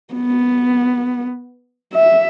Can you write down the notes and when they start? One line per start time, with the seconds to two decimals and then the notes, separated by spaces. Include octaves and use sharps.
0.14 B3
1.93 E5